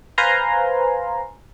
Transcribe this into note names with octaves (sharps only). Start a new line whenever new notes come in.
B4 C5 F5 G#5 A#5 C6